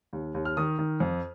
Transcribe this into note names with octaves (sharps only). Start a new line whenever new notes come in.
D#2
D#2
F6
D#3 D#6
D#3
F2